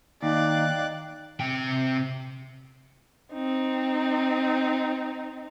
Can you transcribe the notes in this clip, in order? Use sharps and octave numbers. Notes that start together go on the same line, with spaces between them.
D#2 D#4 D5 D#5 F5 G5 F#6
C3 G5
C4 D#4